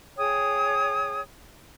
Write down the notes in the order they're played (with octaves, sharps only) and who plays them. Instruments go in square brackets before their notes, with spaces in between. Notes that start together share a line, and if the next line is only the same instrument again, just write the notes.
[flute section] G#4 C#5 G5 D#6